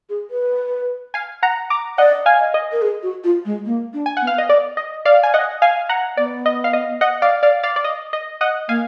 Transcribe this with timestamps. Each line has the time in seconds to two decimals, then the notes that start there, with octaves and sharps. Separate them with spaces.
0.10 G#4
0.31 B4
1.14 F5 G#5
1.43 F#5 A#5
1.70 A#5 D6
1.98 D5 D#5 F#5
2.26 F5 G#5
2.40 D#5
2.54 D#5
2.72 A#4
2.82 G#4
3.03 F#4
3.24 F4
3.45 G#3
3.66 A#3
3.94 D4
4.06 G#5
4.17 B3 F#5
4.27 F5
4.38 D#5
4.49 D5
4.77 D#5
5.05 D5 F5
5.23 G#5
5.34 D#5 F#5
5.62 F5 G#5
5.89 F#5 A#5
6.17 B3 D5
6.46 D#5
6.64 F5
6.73 D#5
7.01 D#5 F#5
7.22 D5 F5
7.43 D5 F5
7.63 D5 F5
7.76 D5
7.84 D#5
8.13 D#5
8.41 D#5 F#5
8.68 A#3 F5 G#5